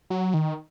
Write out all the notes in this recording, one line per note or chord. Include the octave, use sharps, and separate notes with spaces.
F#3
D#3